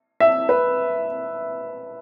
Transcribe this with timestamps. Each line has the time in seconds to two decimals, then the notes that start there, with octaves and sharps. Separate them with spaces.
0.20 E5
0.49 B4